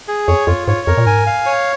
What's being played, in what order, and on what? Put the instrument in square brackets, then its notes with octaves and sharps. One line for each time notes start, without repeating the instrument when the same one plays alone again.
[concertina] G#4
[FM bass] F2 [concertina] C#5
[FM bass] F2 [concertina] F4
[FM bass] G#2 [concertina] C#5
[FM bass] F2 [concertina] A#4
[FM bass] A#2
[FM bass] G#2 [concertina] G#5
[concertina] F5
C#5